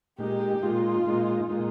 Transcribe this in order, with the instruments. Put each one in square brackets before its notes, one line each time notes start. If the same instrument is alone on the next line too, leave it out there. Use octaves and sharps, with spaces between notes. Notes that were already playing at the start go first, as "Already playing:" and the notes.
[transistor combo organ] A#2 G#3 D#4 [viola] G4
[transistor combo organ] A#2 G#3 D#4 [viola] F4
[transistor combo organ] A#2 G#3 D#4
A#2 G#3 D#4